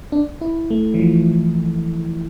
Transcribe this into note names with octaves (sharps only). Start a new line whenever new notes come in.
D4
E4
A3
E3
F3